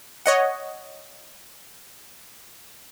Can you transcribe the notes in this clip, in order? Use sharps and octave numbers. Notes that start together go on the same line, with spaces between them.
C#5 D#5 F#5